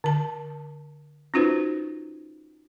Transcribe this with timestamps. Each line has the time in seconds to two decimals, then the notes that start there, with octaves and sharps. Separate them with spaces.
0.04 D3 A5
1.34 C#4 D#4 F4 F#4 B4 C5